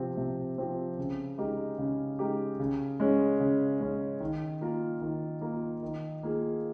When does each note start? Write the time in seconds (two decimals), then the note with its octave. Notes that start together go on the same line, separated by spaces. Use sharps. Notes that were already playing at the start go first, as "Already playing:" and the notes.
Already playing: C3 F3 C4 G4
0.17 C3
0.58 F3 C4 G4
0.98 C#3
1.38 G#3 D#4 G4 A#4
1.78 C#3
2.19 G#3 D#4 G4 A#4
2.60 C#3
3.00 G#3 C#4
3.40 C#3
3.81 G#3 C#4
4.20 D#3
4.61 A#3 F4 A#4
5.02 D#3
5.41 A#3 F4 A#4
5.83 D#3
6.23 A#3 F4 G#4